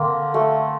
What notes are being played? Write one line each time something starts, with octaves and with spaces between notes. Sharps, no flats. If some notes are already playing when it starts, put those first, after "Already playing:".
Already playing: D3 A#3 C4
A3